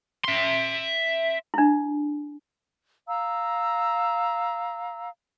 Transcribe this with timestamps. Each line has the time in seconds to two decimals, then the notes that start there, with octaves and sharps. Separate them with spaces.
0.25 E5 C6
1.54 D4 E4
3.08 F5 A#5 E6